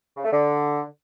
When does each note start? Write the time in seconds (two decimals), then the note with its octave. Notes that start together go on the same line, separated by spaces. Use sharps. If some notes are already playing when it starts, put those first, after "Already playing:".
0.17 C#3
0.24 A3
0.32 D3